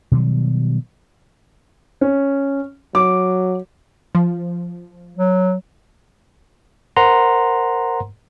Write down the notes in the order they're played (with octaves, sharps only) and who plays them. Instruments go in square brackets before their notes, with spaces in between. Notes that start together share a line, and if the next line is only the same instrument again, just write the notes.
[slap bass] B2 D#3 F#3 G3
[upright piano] C#4
[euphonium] F#3 [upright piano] D6
[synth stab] F3
[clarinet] F#3
[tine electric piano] A#4 C5 F#5 A#5 C6